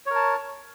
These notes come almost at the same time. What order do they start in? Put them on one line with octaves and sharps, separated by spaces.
C#5 A#4 A5